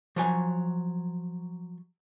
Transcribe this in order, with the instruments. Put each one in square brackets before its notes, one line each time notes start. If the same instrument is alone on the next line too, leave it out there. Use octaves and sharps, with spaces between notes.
[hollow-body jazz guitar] F3 F#3 G#5